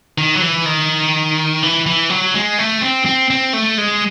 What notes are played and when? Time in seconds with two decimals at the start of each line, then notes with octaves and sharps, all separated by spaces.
0.18 D#3
0.35 F#3
0.42 E3
0.66 D#3
1.63 E3
1.86 E3
2.10 F#3
2.34 G#3
2.58 A3
2.82 C4
3.06 C4
3.30 C4
3.53 A3
3.78 G#3